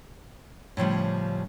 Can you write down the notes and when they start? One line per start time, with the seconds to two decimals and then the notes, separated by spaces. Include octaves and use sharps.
0.77 A2 C#3 F3 G3